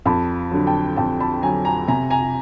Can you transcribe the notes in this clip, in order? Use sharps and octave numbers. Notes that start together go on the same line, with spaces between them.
F2 A5 B5
D3 F#3
G5 A5
F2 G5 A5
A5 B5
D3 F#3 G#5 A#5
G#5 A#5
C3 G#5 A#5
G#5 A#5